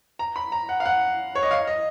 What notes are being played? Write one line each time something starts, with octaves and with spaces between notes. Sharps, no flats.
A#5
B5
A#5
F#5
F5
F#5
C#5
D#5
F5
D#5